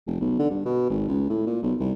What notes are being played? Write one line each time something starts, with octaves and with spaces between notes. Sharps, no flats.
F1
B1
D3
G2
B2
G#1
C#2
A2
A#2
B1
C2